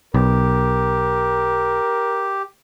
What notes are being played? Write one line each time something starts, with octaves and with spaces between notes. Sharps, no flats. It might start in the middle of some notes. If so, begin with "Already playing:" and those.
B1 G4 A#4